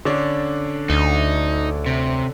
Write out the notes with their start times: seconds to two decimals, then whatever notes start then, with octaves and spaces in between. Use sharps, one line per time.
0.05 D3 C#4 D4
0.90 D2 D#4
1.86 C3